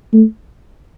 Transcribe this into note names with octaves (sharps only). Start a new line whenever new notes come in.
A3